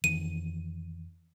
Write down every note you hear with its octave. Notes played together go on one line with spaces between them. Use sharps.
F2 D#3 E3 D#7